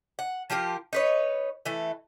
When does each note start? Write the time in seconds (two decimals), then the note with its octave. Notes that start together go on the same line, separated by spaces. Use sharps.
0.19 F#5
0.50 F3 F4 G4 A#4
0.93 D#4 B4 C#5
1.65 E3 A3